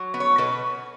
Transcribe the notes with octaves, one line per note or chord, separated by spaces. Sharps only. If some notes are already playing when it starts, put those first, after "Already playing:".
Already playing: F#3
B3
C#5
B2 B4